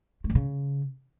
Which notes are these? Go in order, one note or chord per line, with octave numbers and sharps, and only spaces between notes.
A3
E3
C#3